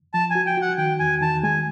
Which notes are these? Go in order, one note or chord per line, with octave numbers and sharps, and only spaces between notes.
F3 A5
G#5
F#4
G5
F#4 F#5
D#3 G5
E2 G#5
D#3 A5
G#3 G#5